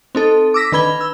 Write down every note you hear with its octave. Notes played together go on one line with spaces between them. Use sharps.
C4 D#4 A4
D6 E6 A#6 B6
D#3 D4 B4 B5 G#6 G7
E6